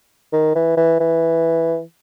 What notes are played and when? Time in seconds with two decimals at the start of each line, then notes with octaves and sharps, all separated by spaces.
0.32 D#3
0.55 E3
0.77 E3
1.00 E3